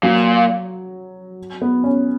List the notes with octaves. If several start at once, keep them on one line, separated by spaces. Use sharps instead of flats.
A#2 F#3
B3
C#4